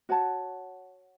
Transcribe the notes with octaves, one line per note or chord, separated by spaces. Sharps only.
F#4 C#5 F#5 A5